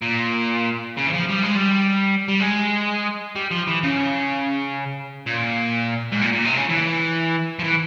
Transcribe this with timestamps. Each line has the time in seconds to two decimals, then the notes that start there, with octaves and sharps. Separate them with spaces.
0.02 A#2
0.97 C#3
1.07 E3
1.13 F3
1.29 G3
1.43 G#3
1.56 G3
2.28 G3
2.40 G#3
3.35 G3
3.51 F3
3.67 E3
3.83 C#3
5.26 A#2
6.12 G#2
6.21 A#2
6.33 A#2
6.45 C3
6.57 C#3
6.69 E3
7.59 F3
7.64 E3